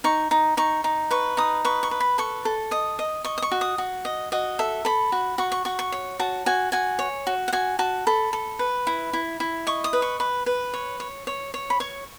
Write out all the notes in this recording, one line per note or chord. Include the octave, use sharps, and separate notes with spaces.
D#4 C#6
D#4
D#4 C#6
D#4
B4 C#6
D#4 D#6
B4 C#6
C#6
B4
B5
A4 C#6
A4
D#5 D#6
D#5
D#5 C#6
D#6
C#6
F#4
D#6
F#4
D#5
F#4 D#5
A4 E5
A4 B5
F#4
F#4 C#6
C#6
F#4 C#6
C#6
C#5
F#4 A5
F#4 G#5
F#4 G#5
C#5
F#4
F#5
F#4 G#5
F#4 A5
A4 B5
A4
B4
E4
E4
E4
D#5 C#6
D#6
B4
C#6
B4
B4
C#5
C#5
C#5
C#5
B5
C#5 C#6